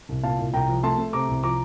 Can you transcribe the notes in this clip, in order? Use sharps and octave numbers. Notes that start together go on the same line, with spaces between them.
C2
A#2 F5 A5
C2
C2 G5 A#5
F3
A3 A5 C6
A3
C3 A#5 D6
C2
F3 A#5 D6